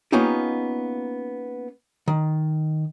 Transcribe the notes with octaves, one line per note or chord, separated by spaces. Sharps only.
A#3 B3 C#4 D#4 F4 G4
D#3